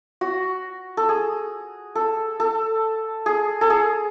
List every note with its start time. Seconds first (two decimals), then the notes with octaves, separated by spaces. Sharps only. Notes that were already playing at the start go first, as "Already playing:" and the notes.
0.21 F#4
0.97 A4
1.09 G#4
1.95 A4
2.40 A4
3.26 G#4
3.61 A4
3.70 G#4